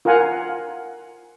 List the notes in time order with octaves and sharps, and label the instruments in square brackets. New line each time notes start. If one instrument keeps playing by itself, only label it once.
[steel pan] F4 A#4 F5 F#5 G#5